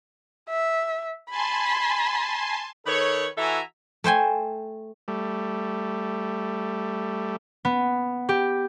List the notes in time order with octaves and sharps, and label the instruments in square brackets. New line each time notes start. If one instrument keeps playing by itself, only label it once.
[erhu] E5
[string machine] G#5 A5 C6 [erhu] B5
[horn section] D#3 A4 B4 C#5
E3 F#4 A4 E5 G#5 A#5
[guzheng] A3 C5 G5 G#5
[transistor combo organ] G3 A3
[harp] B3
G4